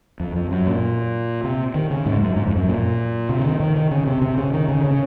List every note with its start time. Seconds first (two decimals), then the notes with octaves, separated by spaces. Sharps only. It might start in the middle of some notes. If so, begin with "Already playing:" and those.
0.20 F2
0.35 F2
0.51 F#2
0.67 A#2
1.44 C3
1.74 D#3
1.90 C#3
2.06 G#2
2.21 F#2
2.36 G#2
2.47 F2
2.57 F#2
2.68 A#2
3.29 C3
3.39 C#3
3.45 D#3
3.60 D#3
3.76 D#3
3.91 C#3
4.07 C3
4.22 C3
4.37 C#3
4.53 D#3
4.68 C#3
4.84 C#3